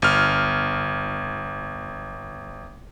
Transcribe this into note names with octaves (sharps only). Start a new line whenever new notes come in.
G1 F6